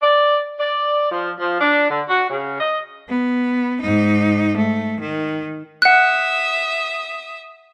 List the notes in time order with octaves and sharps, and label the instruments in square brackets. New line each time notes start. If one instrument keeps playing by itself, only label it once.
[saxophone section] D5
D5
F3
F3
D4
D3
F#4
C#3
D#5
[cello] B3
G#2 D#4
A3
D#3
[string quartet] E5 D#6 [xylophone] F#5 F#6